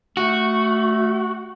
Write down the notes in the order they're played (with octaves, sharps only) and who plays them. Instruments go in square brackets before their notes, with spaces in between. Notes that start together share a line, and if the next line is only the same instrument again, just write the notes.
[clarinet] A3 [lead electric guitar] F#4